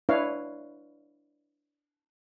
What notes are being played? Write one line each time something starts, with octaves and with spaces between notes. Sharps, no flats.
D4 E4 B4 C#5 F5